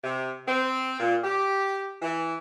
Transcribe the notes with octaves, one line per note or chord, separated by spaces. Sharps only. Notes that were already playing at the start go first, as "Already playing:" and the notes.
C3
C4
A#2
G4
E3